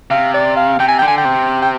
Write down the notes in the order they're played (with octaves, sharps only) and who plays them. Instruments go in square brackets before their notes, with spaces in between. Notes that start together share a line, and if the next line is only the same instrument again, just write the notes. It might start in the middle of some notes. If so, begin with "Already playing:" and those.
[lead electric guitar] C3 [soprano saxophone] F5
[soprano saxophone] D5
F5
[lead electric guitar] C3 [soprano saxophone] G5
[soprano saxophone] G#5
[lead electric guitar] D3 [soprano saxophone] G5
[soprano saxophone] G#5
G5
[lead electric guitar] C3
[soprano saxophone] G5